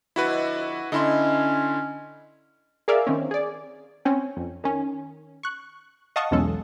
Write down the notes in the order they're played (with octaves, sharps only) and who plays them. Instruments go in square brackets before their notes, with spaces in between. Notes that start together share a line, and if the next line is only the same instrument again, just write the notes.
[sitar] F2 D3 [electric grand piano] E4 F#4 B4
[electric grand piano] D3 E4 C6 [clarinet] C#4 [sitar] D#5
[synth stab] G#4 A#4 D5 E5 F5
D#3 C4 C#4
G#4 D5
[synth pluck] C4 C#4
F2
D#3 C#4
C#6 F#6
D#5 F5 F#5 A5 C#6 D#6
B1 E2 G#3 C#4 A4